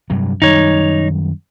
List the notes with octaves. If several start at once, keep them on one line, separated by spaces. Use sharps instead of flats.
G2 C3 F#3
F#2 D#3 G3 D#4 C#5